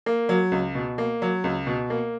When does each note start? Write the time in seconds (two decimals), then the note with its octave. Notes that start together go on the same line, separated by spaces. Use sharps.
0.06 A#3
0.29 F#3
0.52 C#2
0.75 B2
0.98 A#3
1.22 F#3
1.44 C#2
1.67 B2
1.90 A#3